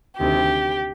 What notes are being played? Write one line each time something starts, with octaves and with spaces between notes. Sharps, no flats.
D2 C3 D#3 G4